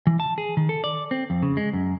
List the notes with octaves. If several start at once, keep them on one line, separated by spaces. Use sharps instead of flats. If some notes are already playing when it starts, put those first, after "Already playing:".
E3
A5
G#4
D#3
A4
D5
C4
F2
C#3
G#3
F#2